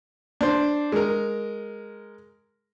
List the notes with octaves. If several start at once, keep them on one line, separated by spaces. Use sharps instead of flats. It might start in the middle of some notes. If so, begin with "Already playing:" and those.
D4 C5
G#3 A#4